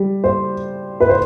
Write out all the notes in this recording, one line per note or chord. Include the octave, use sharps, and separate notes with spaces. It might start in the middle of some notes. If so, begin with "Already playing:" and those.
Already playing: G3
C5
B4
C5